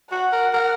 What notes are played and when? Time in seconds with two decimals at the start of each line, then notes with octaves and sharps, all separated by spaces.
0.11 F#4 F#5
0.33 A#4
0.53 A#4